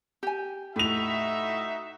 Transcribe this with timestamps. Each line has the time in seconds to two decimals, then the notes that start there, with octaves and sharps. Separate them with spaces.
0.23 G4 G#5
0.76 A2 D#4 F#4 E5 F7